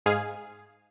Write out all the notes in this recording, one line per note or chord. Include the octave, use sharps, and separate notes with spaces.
G#2 G#4 F5